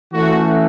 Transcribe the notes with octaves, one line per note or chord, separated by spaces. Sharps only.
E3 A3 C#4 F#4